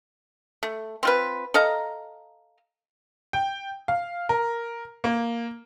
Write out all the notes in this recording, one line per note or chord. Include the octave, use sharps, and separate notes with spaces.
A3
C4 F4 B4
A4 D#5 F5 A#5
G5
F5
A#4
A#3